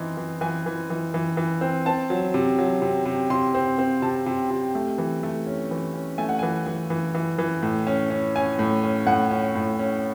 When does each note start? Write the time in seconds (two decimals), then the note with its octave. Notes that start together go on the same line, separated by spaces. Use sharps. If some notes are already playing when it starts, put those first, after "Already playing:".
Already playing: E3 C4 D#4 C6
0.17 E3
0.41 E3 G#5
0.66 E3
0.90 E3
1.14 E3
1.37 E3
1.61 C4
1.86 C4 A5
2.10 F#3
2.34 C3
2.59 F#3
2.82 C3
3.05 C3
3.30 C3 C6
3.54 C4
3.78 C4
4.02 C3 A5
4.26 C3
4.50 C3
4.75 A3
4.98 E3
5.23 A3
5.47 C#4
5.71 E3
5.94 C#4
6.18 A3 G#5
6.29 F#5
6.39 E3 G#5
6.66 E3
6.90 E3
7.14 E3
7.38 E3
7.63 A2
7.87 C#4
8.10 C#4
8.36 C#4 G#5
8.59 A2
8.84 C#4
9.07 A2 F#5
9.31 C#4
9.55 A2
9.79 C#4